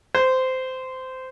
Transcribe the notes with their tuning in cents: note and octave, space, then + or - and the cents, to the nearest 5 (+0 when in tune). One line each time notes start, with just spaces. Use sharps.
C5 -15